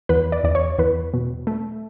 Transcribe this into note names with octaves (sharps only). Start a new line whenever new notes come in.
E2 B4
D5
E2 D5
C#5
E2 B4
B2
A3